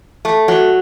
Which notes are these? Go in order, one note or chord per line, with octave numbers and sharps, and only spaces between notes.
A3
F#3